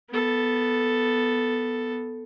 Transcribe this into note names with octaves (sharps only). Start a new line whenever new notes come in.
B3 A4